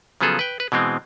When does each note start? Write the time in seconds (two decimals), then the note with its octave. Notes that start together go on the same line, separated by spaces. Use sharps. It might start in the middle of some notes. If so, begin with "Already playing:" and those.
0.21 C#3 F3 F#3 B3 G#4 A4
0.39 B4 G5
0.60 B4
0.72 B2 E3 G#3 C4